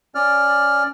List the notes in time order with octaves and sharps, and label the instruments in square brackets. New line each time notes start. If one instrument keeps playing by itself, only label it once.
[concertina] C#4 D5 F6